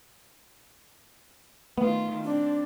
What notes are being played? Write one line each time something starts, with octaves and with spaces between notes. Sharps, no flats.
D#3 A3 B3 F4
C4 D4